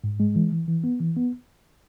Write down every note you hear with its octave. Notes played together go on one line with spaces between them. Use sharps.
G#2
G#3
E3
E3
E3
B3
E3
B3